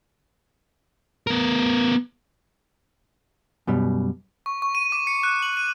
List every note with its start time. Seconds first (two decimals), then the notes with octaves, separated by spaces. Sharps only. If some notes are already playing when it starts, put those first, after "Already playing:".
1.27 B3 A#4
3.67 F#2 B2 G3
4.46 C#6
4.62 C#6
4.75 D#7
4.92 D6
5.07 C#7
5.23 F#6
5.43 F#7
5.57 D#7